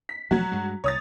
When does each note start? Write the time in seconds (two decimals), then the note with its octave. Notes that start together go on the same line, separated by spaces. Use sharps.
0.09 B6
0.31 E1 F3 F#3 A3 F#4
0.52 G2 G#3
0.84 C2 C#5 D#6 A6